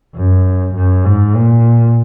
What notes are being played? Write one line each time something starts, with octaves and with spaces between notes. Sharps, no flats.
F#2
F#2
G#2
A#2